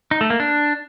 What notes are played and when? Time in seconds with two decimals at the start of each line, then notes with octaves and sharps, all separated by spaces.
0.11 D#4
0.21 A3
0.30 A#3
0.40 D4